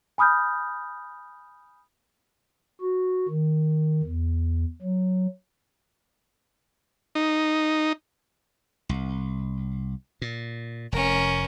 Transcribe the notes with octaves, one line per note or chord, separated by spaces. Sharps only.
G#5 B5 D#6 F6 G6
F#4
D#3
E2
F#3
D#4
C2
A#2
F1 C#4 A#4